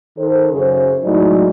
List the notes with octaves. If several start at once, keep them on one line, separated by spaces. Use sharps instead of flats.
D#3 A4 C5
F#2 C#3 G#4 C5
A2 F#3 G#3 D#4 D5